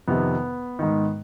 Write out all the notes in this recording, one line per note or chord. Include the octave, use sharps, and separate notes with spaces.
F2 C3 D#3 B3
G#2 D#3